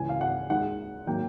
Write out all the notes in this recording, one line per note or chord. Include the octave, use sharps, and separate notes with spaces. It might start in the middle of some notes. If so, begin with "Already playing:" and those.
Already playing: C#2 C#3 E3 G#5
F5
F#5
D#2 D#3 G#3 F#5
D#3 F#3 A#3 G5